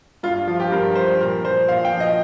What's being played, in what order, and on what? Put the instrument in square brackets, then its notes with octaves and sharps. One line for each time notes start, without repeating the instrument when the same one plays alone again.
[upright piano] G2 F4
F3 F4
G4
G2 A#4
F3 C5
A#2 A#4
F3 C5
A#2 F5
G5
F3
D#5